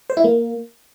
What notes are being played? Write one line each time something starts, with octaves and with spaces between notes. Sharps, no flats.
C5
E4
A#3